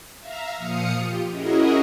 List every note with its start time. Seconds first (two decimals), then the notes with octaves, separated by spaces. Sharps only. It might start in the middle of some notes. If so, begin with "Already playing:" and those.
0.20 E5 F5 A#5
0.57 A#2 F3 F5 D#6 C#7
0.98 F4 G4
1.30 C#4 E4 F#4 G#4 A#4 D#5